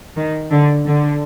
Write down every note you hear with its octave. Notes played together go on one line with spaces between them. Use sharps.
D#3
D3
D3